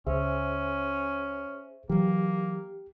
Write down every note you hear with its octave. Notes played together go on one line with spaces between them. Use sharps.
C#2 C#4 G#4 C5 E5
E3 F#3 A#3 G4